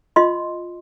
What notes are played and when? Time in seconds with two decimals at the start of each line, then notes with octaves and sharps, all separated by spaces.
0.16 F4 D#5 C6